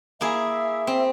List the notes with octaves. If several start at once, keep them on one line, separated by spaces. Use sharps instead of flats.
A#3 E4 G#4 E5
C4